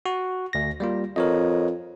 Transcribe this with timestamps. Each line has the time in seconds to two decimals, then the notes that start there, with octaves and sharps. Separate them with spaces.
0.06 F#4
0.53 D2 A#6
0.80 G3 A#3 F4
1.16 F2 A#4 C#5 D#5